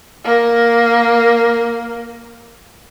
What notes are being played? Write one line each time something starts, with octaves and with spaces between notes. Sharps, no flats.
A#3 A#4